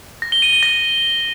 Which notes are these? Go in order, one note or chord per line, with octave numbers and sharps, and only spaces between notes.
A#6
G7
D#7
G7
A#6